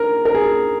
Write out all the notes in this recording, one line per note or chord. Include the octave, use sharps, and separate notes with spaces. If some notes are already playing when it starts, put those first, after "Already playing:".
Already playing: A#4
A#4
G#4